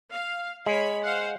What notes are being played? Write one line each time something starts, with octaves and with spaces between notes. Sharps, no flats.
F5
G#3 C#5 B5
C5 F5 F#5